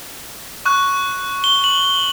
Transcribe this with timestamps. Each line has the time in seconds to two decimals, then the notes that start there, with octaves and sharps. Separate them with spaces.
0.65 C#6 F#6
1.44 G7
1.64 F#7